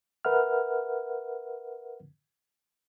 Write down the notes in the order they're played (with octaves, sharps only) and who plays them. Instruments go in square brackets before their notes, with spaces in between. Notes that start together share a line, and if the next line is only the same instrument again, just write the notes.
[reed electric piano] A#4 B4 E5 F#5 F6